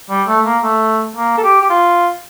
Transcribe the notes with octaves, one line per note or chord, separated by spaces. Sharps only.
G3
A3
A#3
A3
A#3
A4
G4
G4
F4